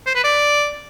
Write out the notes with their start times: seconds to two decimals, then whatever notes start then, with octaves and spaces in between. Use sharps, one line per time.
0.06 C5
0.15 B4
0.24 D5